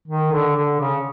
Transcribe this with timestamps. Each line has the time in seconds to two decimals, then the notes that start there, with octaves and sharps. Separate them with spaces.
0.07 D#3
0.32 D3
0.56 D3
0.80 C#3